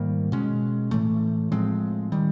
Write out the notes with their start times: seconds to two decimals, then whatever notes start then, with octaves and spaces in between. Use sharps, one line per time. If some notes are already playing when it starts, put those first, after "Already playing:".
Already playing: G#2 D#3 G3 A#3
0.32 B2 G#3 C#4
0.91 A2 E3 A3
1.52 A2 F3 G#3 C4
2.12 D#3 G3